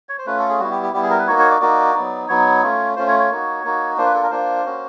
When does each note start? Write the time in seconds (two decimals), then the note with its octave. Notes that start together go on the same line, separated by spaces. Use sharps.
0.09 C#5
0.19 C5
0.26 A3 C#4 F4 B4
0.38 A4
0.49 G#4
0.60 G3 B3 E4 F#4
0.71 G4
0.83 G4
0.93 G3 B3 E4 G4
1.03 G#4
1.10 A#4
1.19 B4
1.27 A#3 D#4 F#4 C#5
1.39 C#5
1.51 D5
1.61 A#3 D#4 F#4 D5
1.95 F#3 B3 D#4
2.28 F#3 B3 D#4 C#5
2.63 A3 C#4 F4
2.96 A3 C#4 F4 C5
3.08 C#5
3.19 C#5
3.30 A#3 D#4 F#4
3.64 A#3 D#4 F#4
3.98 A#3 D4 F4 C5
4.06 B4
4.14 A4
4.23 A#4
4.31 A#3 D4 F4 C5
4.65 A#3 C#4 F#4